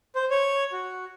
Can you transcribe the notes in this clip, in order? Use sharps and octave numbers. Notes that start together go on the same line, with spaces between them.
C5
C#5
F#4